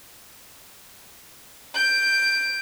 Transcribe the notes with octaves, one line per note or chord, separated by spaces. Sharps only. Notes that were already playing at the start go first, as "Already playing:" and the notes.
G6 D7